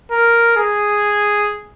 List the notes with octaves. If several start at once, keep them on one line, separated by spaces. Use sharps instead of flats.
A#4
G#4